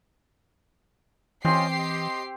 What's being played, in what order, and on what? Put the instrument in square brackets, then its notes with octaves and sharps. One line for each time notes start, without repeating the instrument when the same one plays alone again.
[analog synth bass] E3 [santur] C4 [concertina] C#4 F4 D#5 [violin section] G4 C7
[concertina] D#5